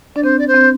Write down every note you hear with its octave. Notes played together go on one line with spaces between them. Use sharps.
D4 D5
C4 C5
D5
C5
C4